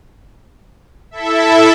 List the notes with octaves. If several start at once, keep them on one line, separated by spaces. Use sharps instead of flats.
E4 A4 E5